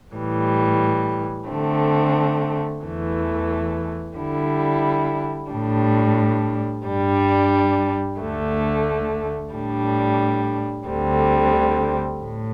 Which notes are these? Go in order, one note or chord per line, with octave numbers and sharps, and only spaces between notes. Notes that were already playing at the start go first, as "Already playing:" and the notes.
A2 E3 G3
D3 A3 C4
E2 E3 A3
D3 G3 E4
A2 G3 D4
G2 G3 D4
D2 D3 A3
A2 G3 D4
D2 D3 G3 C4
A2